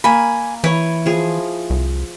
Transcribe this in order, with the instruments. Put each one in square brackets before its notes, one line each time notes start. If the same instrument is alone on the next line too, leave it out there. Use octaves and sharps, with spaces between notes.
[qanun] A#3 [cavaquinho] G#5 B5
[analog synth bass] E3 [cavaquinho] E4 [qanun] B4 C#5
[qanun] F3 G#4
[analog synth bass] C2